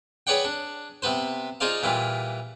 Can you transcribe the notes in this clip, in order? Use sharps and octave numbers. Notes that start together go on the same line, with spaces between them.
G#4 B4 C#5 D5 F#5 G5
D4
C3 B3 B4 C5
D#4 F4 G#4 C5 D5 F5
A#2 E3 G3 F4